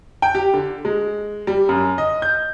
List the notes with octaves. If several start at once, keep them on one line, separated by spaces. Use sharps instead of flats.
G5
G4
D3
G#3
G3
F#2
D#5
G6